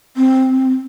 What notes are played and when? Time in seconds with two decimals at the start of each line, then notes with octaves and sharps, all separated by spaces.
0.17 C4